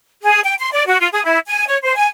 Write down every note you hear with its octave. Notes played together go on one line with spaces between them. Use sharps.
G#4
G5
C6
D5
F#4
F4
G#4
E4
G#5
C#5
C5
G#5